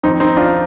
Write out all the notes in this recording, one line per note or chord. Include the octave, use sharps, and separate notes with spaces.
F2 D#3 C4 D#4
C4 D#4
D4 F4